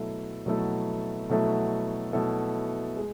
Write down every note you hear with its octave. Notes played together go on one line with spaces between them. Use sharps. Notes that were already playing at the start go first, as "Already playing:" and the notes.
Already playing: B2 F#3 A3 E4 A4
B2 F#3 A3 E4 A4
B2 F#3 A3 E4 A4
B2 F#3 A3 E4 A4
G#3